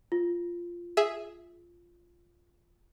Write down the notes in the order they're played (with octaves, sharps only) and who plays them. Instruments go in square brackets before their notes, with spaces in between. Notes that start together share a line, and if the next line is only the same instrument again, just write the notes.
[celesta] F4
[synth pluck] G#4 E5